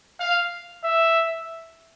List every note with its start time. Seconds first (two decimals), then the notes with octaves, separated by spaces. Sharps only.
0.20 F5
0.84 E5